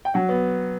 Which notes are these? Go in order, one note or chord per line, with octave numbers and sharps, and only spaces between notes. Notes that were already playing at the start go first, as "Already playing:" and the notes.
G5
F#3 F#5
B3